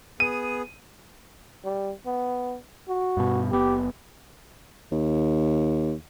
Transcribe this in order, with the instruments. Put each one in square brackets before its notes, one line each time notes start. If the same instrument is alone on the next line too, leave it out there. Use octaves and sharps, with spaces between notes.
[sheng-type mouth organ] B3 G#4 [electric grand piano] D#7
[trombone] G3
B3
F#4
[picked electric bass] G2 B2
[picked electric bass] F#1 B3 [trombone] G4
[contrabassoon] D#2